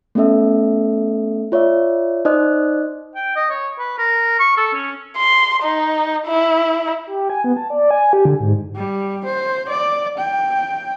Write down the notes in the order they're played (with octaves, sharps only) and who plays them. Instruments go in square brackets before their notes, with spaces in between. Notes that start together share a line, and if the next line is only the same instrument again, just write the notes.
[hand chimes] A3 B3 C#4 A4 E5
F4 C#5 D5 E5
D#4 C5 D5 D#5 D#6 F#6
[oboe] G5
D#5
C#5
B4
A#4
C#6
A4
C#4
[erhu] C6
D#4
E4
[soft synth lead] G4
G#5
B3
A5
D5
G#5
G4
D3
G#2
[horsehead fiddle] G3
C5
D5
G5